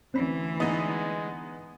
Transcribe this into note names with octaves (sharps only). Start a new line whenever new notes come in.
D2 E3 C4 C#4 B5
G#3 B3 D#4 D#5